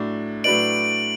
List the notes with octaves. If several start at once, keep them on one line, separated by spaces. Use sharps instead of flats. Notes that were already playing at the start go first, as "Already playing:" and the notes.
Already playing: A2 F#3 D4
A2 F#3 D4 B4 D5 D7 F#7